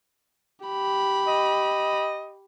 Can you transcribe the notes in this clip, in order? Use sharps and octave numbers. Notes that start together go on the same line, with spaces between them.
G4 B5
D#5